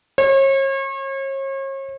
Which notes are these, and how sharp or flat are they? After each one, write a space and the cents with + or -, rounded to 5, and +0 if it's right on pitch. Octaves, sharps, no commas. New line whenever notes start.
C#5 -40